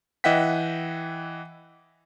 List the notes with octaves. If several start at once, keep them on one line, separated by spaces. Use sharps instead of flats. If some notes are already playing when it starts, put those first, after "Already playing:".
E3 D#5 E5 F#5 G5 B6